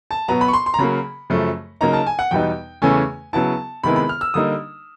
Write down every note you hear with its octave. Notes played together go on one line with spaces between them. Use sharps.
A5
B2 F#3 B3 A#5
B5
C#6
C6
C6
A#5
C#3 F#3 A#3 B5
F#2 C#3 F3 A3
C#3 F#3 A#3 D#4 A#5
A5
G#5
F#5
E2 B2 G3 B3 D#4 G5
E2 C#3 E3 A3 C#4 G#5
C#3 F#3 B3 E4 A5
C3 D#3 G#3 B3 E4 B5
B5
F6
E6
D3 G3 A#3 D#4 D#6